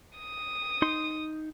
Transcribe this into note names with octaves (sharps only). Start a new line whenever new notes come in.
D#6
D#4 C6